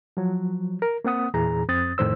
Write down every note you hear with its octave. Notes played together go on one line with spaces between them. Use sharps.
F3 F#3
A#4
A#3 C4 F#5 D#6
E2 A#2 E3 G#4 A#5
F2 C4 D#6 A6
F2 A2 D#3 C5 E6